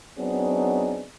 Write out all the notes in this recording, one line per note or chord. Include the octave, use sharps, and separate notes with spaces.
F#3 B3 C4 D4 D#4 G#4